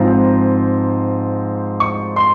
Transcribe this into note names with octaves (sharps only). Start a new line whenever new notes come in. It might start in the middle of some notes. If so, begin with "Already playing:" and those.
Already playing: G#2 F3 C4 A#5
C#6
C6